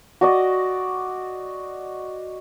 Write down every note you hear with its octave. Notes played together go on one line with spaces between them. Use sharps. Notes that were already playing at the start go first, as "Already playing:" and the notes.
F#4 D5 D#5